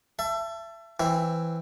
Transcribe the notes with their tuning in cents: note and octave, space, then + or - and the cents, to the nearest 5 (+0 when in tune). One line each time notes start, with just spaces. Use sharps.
E5 +30 A5 +0
E3 +0 C4 +0 E4 +10